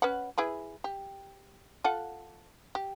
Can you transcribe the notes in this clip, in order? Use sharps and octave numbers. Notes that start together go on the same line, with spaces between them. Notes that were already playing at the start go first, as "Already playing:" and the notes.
C#4 B4 F#5
E4 G#4 B4
G4
F4 A4 F#5
G4